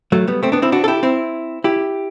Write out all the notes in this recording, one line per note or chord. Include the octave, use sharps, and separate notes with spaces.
F#3 A3
G3 B3
A3 C4
B3 D4
C4 E4
D4 F#4
A4
E4 G4
C4 E4
E4 G4